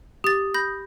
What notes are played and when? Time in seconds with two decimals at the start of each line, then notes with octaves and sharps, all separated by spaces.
0.24 G4 D#6 A6
0.54 B5 G6 A#6